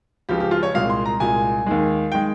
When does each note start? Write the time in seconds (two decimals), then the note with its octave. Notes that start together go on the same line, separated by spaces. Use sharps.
0.29 C#2 C#3 F3 G4
0.40 G4
0.51 F4
0.63 C#5
0.74 C2 A#2 G#3 F5
0.90 C6
1.06 A#5
1.20 C2 A#2 G#3 G#5
1.66 D#2 D#3 G#3
2.12 D#3 G#3 G5